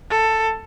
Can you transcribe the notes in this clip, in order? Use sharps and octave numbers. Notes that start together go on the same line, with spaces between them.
A4